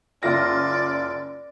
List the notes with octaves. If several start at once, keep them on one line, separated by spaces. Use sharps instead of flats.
F#1 F4 D5 A#6